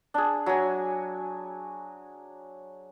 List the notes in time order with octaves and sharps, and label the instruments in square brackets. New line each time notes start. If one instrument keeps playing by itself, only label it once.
[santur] D4 G#4
F#3 G#5